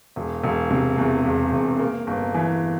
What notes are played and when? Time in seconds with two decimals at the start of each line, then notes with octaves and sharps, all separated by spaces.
0.16 E1
0.43 E1
0.71 C3
0.98 E2
1.25 E1
1.52 E1
1.80 A#3
2.07 G1
2.34 E3